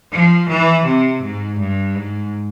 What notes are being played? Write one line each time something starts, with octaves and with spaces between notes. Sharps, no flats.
F3
E3
C3
G#2
G2
G#2